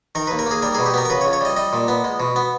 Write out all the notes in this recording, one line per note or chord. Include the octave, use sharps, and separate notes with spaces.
D#3 A#4
D#2 B4
A#4
A#3 G#4
G3 A#4
B2 G#4
G4
B3 A#4
A#4
C#3 B4
C#5
C#2
C#5
G3 D#5
G3 D#5
A#2
B3
G#3
B2
B3